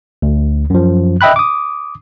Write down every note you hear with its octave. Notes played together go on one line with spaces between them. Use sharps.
D2
F#2 F3
D#5 E5 G5 B5 F#6
D6 D#6